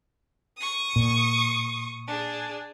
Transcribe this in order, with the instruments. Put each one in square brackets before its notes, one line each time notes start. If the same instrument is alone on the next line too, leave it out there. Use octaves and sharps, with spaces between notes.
[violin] C#6 D#6
[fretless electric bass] A#2
[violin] D4 G#4